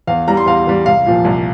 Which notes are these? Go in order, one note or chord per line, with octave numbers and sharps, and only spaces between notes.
E2 F5
E3 G3 A#5
C6
E2 F5
E3 G3
C2 F5
A#2 F3
C2